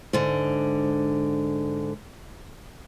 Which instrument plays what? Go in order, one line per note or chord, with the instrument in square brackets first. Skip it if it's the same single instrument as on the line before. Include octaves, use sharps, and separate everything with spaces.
[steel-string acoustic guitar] G#2 D3